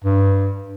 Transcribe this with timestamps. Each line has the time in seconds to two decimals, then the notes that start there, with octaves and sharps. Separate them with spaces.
0.04 G2